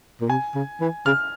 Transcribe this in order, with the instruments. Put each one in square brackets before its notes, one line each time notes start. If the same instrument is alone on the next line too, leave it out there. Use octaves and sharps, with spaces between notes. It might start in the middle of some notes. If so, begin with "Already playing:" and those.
[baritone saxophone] A#2
[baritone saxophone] C3 [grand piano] G#5
[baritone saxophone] C#3
E3
[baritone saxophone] C#3 [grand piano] F6